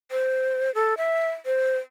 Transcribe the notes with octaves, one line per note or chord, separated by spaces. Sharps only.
C5
A4
E5
C5